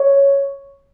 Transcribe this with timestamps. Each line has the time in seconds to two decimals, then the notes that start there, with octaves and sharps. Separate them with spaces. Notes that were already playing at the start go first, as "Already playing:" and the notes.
Already playing: C#5